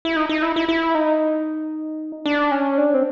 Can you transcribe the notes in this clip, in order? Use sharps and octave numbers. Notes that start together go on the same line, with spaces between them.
E4
D#4
D#4
E4
E4
E4
D#4
D4
C#4
D4
C4